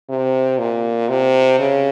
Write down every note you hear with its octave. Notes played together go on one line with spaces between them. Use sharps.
C3
A#2
C3
C#3